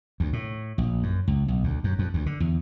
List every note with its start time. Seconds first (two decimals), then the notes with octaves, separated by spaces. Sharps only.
0.20 D2
0.33 A2
0.78 A#1
1.03 F#2
1.28 C#2
1.48 B1
1.64 D2
1.84 F#2
1.99 F2
2.14 D2
2.26 D3
2.40 E2